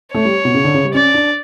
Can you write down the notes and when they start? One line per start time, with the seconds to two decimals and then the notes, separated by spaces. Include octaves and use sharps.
0.14 A3 C#5
0.25 G3
0.45 B2
0.54 C#3
0.64 D3
0.74 C#3
0.85 G3
0.94 C#4 D5
1.14 D4